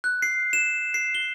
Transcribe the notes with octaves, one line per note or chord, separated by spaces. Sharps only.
F#6
C7
E7
C7
G7